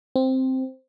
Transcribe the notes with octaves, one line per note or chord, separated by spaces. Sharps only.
C4